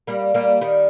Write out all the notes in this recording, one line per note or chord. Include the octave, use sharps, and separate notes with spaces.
G3 A#3
G3 A#3
D#3 G3